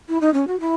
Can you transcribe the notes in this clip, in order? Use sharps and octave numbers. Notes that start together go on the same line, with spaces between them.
E4
D#4
C#4
F#4
E4